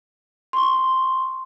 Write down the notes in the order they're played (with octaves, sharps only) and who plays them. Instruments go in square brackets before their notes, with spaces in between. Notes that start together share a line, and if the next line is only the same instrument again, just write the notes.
[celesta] C6 C#6